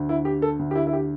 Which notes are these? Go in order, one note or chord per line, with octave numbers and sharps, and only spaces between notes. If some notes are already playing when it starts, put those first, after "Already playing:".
Already playing: D2 D3
E4
G4
A4
D2 D3
G4
E4
E4
G4